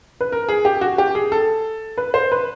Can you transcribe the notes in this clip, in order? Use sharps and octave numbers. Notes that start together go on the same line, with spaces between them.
B4
A#4
G#4
G4
F#4
G4
G#4
A4
B4
C5
B4